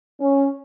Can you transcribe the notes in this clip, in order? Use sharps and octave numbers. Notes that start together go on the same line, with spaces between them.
C#4